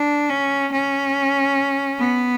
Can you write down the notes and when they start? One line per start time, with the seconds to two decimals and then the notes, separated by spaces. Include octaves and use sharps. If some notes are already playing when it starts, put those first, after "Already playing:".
Already playing: D4
0.30 C#4
0.72 C#4
1.99 B3